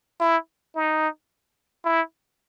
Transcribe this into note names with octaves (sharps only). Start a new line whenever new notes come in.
E4
D#4
E4